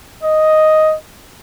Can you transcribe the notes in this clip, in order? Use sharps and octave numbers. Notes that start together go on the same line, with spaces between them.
D#5